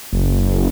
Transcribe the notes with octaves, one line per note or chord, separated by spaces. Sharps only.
F#1